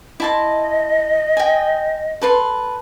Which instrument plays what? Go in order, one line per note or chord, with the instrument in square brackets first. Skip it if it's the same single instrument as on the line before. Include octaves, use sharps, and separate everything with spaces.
[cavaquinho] E4 A5 C6 [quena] D#5
[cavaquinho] G5 G#5
A4 B4 C6